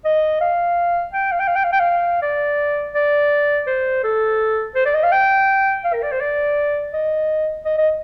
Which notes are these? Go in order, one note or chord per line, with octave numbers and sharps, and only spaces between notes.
D#5
F5
G5
F5
G5
F5
G5
F5
G5
F5
D5
D5
C5
A4
C5
D5
D#5
F5
G5
F5
A#4
D5
C5
D5
D#5
D#5
D#5